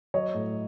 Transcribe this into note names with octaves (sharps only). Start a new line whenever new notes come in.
F#3 C#5 D#5
A2